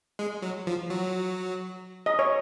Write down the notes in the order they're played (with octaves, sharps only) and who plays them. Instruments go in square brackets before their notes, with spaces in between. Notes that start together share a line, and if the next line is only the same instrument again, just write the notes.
[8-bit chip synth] G#3
F#3
F3
F#3
[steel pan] D#5
C#5